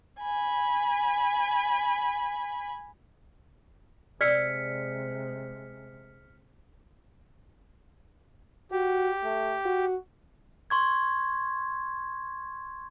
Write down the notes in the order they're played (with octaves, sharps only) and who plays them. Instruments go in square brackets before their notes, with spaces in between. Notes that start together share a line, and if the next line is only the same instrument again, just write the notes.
[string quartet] G#5 B5
[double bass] C3 G#3 [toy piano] D5 E6 [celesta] F6 B6 C#7
[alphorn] F#4 [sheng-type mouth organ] G4
[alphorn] A3
F#4
[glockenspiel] C6 C#6 G#6